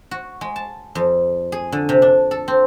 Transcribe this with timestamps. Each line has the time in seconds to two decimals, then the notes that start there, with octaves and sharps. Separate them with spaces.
0.11 F#4
0.41 G#3
0.56 A5
0.95 F2
1.52 G#4
1.72 D3
1.89 C3
2.02 D4
2.31 A4
2.48 C4